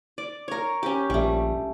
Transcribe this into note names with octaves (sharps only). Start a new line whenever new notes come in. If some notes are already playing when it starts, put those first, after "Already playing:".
D5
A#4 C#5
C#4 G4
A#1 G3 A3